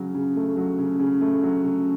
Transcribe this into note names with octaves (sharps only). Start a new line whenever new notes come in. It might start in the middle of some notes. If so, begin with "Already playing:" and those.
Already playing: C#3 F#3
C#3
A3
F#3
C#3
C#3
A3
F#3
C#3